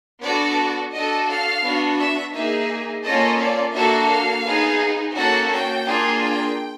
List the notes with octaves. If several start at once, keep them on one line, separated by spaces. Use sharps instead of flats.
B3 D4 F#4 A4 D5
D4 F#4 A4 D#5
F5
B3 D4 F#4
E5
A#3 D#4 G#4 E5
A#3 C#4 F4 A4 D#5
D5
A#3 D4 F#4 A4 E5
F5
B3 D#4 G#4
A#3 C#4 F#4 A4 F#5
G5
A#3 D4 F4 G#4
G5